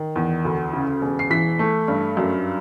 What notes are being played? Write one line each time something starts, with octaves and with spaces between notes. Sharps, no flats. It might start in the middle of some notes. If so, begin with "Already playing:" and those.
Already playing: D#3
E2
D2
C#3
E1
C7
E3 B6
A3
G2
F#2